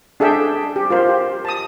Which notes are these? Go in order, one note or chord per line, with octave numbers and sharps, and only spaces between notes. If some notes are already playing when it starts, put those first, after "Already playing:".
D4 G#4 A4 E5 G5
G4
F4 A#4 C5
G4
A5 D#6